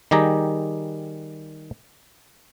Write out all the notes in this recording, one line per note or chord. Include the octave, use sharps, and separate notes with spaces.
D#3 G3 G4 G#4 A#5